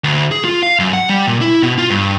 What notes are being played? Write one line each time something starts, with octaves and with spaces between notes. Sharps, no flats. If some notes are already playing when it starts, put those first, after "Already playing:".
D2
G#4
F4
F5
F#2
F#5
G3
A#2
E4
B2
F4
G2